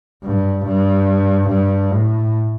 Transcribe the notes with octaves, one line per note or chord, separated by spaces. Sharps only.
G2
G2
G2
A2